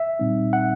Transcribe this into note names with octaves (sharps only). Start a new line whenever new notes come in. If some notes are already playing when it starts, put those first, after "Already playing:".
Already playing: E5
A#2 G3 C4 D#4
F#5